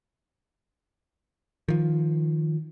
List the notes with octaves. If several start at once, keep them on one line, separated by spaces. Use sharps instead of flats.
D#3 F3